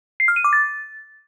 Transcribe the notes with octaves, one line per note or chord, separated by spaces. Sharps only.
C7
F6
D#7
D6
A6